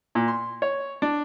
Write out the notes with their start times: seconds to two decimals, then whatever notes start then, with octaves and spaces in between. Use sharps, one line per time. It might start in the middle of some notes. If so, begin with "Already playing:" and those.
0.15 A#2
0.28 C6
0.62 C#5
1.02 D4